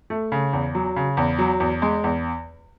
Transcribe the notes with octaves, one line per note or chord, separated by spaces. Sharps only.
A3
C#3
E2
F#3
C#3
E2
F#3
E2
G#3
E2